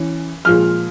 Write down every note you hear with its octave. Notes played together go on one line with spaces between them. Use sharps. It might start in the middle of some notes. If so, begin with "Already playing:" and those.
Already playing: E3 C#4
A#2 F3 G#3 F6